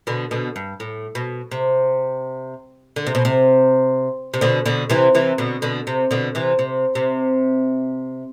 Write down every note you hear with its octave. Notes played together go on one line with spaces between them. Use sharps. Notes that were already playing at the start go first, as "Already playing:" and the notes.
B2 D3
B2 D3
G2
A2
B2
C3
D3
C3
B2
C3
C3
B2 D3
B2 D3
C3 E3
C3 E3
B2 D3
B2 D3
C3
B2 D3
C3 E3
C3
C3